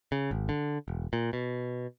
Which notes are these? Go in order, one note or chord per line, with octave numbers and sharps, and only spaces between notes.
C#3
G#1
D3
E1
A#2
B2